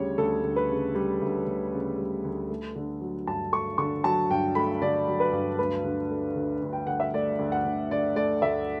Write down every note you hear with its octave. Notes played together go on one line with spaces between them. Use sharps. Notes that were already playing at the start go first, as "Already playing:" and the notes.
Already playing: D2 C#3 G3 C#5
D2 A4
D2
B4
C#3
G3
D2
D2
C#3
G3
D2
A3
D3
F#3
G2 A5
A3 C#6
D3 C#6
F#3 A5
G2 G5
A3 B5
D3 D5
F#3
B4
G2
D2 B4
D3
A3
D2
D2
G5
D3 F#5
E5
A3 D5
D2
F#5
D2
D3 D5
A3 D5
D2 E5